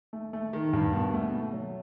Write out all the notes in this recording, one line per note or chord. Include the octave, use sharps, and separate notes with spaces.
A3
A3
D#3
G2
B2
A3
A3
F#3